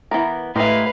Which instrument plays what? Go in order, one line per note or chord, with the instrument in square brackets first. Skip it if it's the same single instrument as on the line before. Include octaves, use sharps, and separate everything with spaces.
[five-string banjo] E3 B3 A#4
[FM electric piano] A2 G4 A#4 [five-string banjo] G#3 E4 [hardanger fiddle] B4 F5